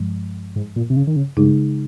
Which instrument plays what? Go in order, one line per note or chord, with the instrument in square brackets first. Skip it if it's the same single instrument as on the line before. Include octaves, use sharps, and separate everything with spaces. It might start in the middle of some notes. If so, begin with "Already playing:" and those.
Already playing: [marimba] G2 F3 G#3
[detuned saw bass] G#2
A#2
C3
C#3
D#3
C#3
[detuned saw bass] G2 [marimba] C#3 G#3 D#4 G#4